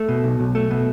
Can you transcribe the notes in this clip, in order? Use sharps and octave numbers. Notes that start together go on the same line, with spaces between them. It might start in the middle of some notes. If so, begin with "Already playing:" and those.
Already playing: A3
B2
B1
B1
A3
B2